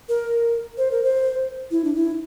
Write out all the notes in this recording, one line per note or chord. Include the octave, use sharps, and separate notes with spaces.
A#4
C5
A#4
C5
E4
D4
E4